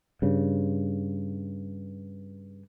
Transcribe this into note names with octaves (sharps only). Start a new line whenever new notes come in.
G2 C#3